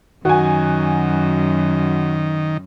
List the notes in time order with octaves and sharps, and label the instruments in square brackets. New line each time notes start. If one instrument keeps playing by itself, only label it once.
[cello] F#2 [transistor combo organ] D#3 [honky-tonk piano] F#4 G#5